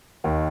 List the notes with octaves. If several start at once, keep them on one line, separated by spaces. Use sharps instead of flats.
D#2 D#3